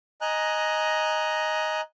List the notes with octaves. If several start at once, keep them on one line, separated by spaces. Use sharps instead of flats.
D#5 G#5 A#5 F#6